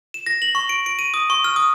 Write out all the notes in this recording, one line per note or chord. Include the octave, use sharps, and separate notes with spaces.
E7
A#6
F#7
C#6
D7
D7
D#7
D#6
C#6
F6
D#6